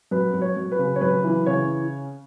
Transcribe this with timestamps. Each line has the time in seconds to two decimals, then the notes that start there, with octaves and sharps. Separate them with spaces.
0.11 F#2 B4
0.34 F#2
0.42 C#5
0.57 F#2
0.72 B4
0.79 C#3
0.96 C#5
1.01 F#2 B4
1.24 E3
1.46 C#3 C#5